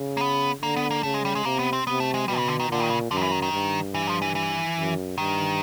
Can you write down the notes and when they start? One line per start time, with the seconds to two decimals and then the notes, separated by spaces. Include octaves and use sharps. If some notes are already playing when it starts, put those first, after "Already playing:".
Already playing: C#3
0.17 A#3
0.21 B3
0.62 D3 A#3
0.76 B3
0.91 A#3
1.03 C#3 A3
1.14 G#3
1.25 G3
1.35 G#3
1.45 C3 A#3
1.59 B3
1.73 C4
1.87 C3 B3
2.00 A3
2.14 G#3
2.28 B2 G3
2.38 C#3
2.48 D3
2.60 D#3
2.69 A#2 D3
2.80 D#3
2.90 C#3
3.11 F#2 D3
3.17 D#3
3.21 E3
3.31 D#3
3.42 D#3
3.53 G2
3.94 E3
4.07 F3
4.22 E3
4.35 E3
4.77 F#2
5.18 G2 D#3